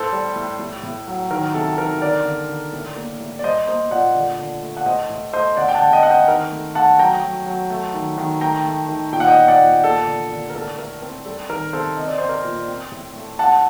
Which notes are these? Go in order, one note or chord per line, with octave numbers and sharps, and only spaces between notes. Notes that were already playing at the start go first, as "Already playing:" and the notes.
Already playing: A2 A4 C5
G3
A2
A2
A2
F#3
D#3 A#4
C3 A4
D#3 A#4
D3 A#4 D5
D3
D3
A2
A#3
A2
D5
G3 C5 D#5
A#3 C5 D#5
A#2 D5 F#5
D3
D3
A3
F#5
A2 C5 D#5
A2
A3 C5 D#5
D3 D5 F#5
G5
F#5 A5
D3
D#5 G5
C4 F#5
D#5 G5
D#3 A#4
A3
A3 F#5 A5
F#3 G5 A#5
F#3
F#3
A3
D#3
D#3
A3 G5 A#5
A3
D#3
A#2 G5
F#5
D#5 G5
A#2
D5 F#5
A#2
A#3 A4
D3
D3
A#4
A2 A4
A3 A#4
C4 A#4
G3 A4
D#3 A#4
C3 A4 C5
C4 D#5
D5
C4 C5
A#4 D5
A#2
C4
A2
A3
A2 F#5 A5